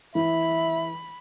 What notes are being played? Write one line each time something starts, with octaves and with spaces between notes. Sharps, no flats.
E3 E5 B5